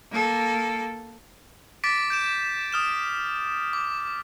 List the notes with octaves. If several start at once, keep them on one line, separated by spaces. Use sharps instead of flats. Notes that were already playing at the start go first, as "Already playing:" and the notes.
A#3 A4
D6 A6 B6 D7
G6 D7 E7
D#6 F6 E7
D6